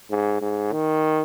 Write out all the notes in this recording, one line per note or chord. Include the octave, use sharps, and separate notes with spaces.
G#2
G#2
D#3